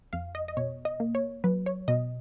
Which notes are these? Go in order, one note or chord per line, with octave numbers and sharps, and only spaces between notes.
F2 F5
D#5
D#5
B2 C#5
D#5
A#3
C#5
F#3 B4
C#5
B2 D#5